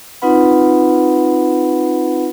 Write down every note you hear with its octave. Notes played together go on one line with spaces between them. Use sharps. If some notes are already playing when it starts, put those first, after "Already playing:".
C4 D#4 F4 B4 F#5 B5